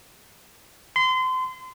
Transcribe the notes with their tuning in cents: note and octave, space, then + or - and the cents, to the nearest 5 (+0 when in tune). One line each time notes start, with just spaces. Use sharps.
C6 -30